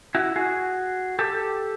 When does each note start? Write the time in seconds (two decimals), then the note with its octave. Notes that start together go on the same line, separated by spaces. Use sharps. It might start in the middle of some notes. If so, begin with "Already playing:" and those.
0.15 E4 F#4
0.36 F#4 G#4
1.19 G4 A4